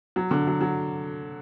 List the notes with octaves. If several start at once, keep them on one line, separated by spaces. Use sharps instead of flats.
F#3
D3
F#3
F#3